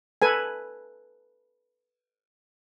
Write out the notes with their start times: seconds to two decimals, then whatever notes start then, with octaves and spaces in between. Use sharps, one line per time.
0.22 A4 B4 G#5